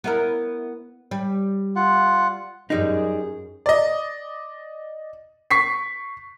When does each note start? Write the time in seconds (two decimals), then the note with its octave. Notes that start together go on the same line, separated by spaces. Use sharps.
0.04 B3 E4 A#4
1.11 G3
1.76 F4 F#5
2.70 F#2 G3 G#3 D#4 G#4
3.66 D5 D#5
5.51 C#6 B6 C7